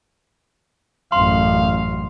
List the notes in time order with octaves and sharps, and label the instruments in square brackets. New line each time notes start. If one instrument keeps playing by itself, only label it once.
[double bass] A1 F#2 [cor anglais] F5 [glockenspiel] C6